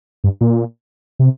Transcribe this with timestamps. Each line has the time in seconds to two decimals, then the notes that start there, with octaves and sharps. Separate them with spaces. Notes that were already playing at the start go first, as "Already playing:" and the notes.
0.24 G2
0.41 A#2
1.19 C3